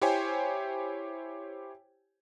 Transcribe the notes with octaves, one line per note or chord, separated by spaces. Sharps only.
E4 G4 C5 C#5 G5 G#5